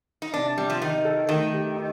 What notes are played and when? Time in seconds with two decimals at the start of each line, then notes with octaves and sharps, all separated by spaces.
0.22 D#4
0.34 C3 D4
0.58 C3 G3
0.70 F3
0.82 D#3 D#4
1.05 A4
1.29 D#3 A3
1.53 G4
1.77 D#4